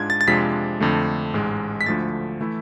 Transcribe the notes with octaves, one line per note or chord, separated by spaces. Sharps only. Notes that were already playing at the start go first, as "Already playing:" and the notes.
Already playing: G#2 G#3 D4 F4 G#6
A6
A6
F2 C3 G#3 D4 F4 B6
F2 D3 A3
A1 G#2 G#3
B6
D2 D3 F3 A3 A6
E3 A3 E4